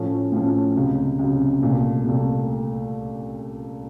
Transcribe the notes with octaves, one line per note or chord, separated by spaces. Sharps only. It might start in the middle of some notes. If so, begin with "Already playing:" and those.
Already playing: A2 F3 A3 C#4
A2 F3 A3 C#4
C#2 C3 F#3
C#2 C3 F#3
C2 A#2 A3
C2 A#2 A3